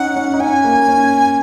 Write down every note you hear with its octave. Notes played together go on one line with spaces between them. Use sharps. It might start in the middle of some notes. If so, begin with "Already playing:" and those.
Already playing: C#4 D#4 F#5
C#4
D#4
C#4 G#5
A#3
C#4